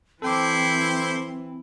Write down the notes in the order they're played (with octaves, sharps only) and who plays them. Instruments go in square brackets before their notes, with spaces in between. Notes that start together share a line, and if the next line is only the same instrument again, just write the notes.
[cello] E3 [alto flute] C4 [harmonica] E4 C5 [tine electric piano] A4 G5 D6